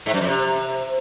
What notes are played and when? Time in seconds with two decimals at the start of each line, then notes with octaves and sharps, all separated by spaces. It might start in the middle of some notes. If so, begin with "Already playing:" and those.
0.06 G#2
0.13 F#2
0.21 F2
0.28 C3